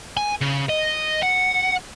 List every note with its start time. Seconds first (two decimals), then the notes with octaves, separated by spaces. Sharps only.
0.17 G#5
0.41 C#3
0.69 D#5
1.23 F#5